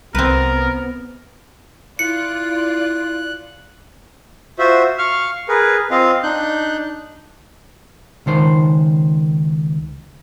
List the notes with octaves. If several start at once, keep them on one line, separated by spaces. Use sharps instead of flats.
C2 B3 C4 A#4 B4
E4 F4 D5 F#6 C#7
F4 F#4 C5 E5
F5 C#6 F6
G#4 A#4 B4
C4 F4 D#5 F5
D4 D#4 F#6 G6
C#2 D#3 C5